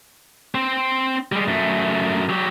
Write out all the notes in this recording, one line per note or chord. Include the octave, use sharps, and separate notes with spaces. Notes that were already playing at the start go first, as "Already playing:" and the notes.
C4 C5
G3 G#3
F#2 A3
F#3 G4